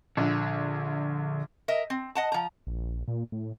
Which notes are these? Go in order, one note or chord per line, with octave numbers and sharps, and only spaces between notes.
A#1 D3
A#4 D#5 E5
C4
D#5 F#5 A5
F3 A#5
A#1
A#2
A2